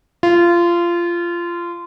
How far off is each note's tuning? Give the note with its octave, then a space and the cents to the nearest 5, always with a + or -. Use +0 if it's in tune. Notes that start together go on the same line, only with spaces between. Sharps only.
F4 -20